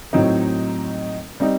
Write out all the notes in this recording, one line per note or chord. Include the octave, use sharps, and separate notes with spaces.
A2 F#3 C4 D#4
G3 C4 D#4